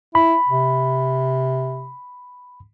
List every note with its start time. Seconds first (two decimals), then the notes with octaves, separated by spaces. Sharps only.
0.15 E4 B5
0.47 C3